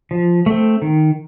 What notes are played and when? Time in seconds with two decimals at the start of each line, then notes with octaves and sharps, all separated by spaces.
0.11 F3
0.46 A3 C4
0.82 D#3